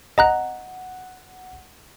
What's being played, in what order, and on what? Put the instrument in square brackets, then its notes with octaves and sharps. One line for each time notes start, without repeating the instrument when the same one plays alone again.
[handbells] D#5 A#5 F#6 [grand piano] F#5